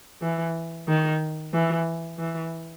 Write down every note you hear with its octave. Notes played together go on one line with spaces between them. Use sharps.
E3
D#3
E3
E3